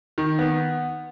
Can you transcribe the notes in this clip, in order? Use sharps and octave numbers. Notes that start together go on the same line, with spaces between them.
D#3
B3